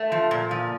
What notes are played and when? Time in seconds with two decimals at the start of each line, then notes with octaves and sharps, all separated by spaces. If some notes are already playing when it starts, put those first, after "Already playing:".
Already playing: A3
0.12 F3
0.31 A#2
0.51 F3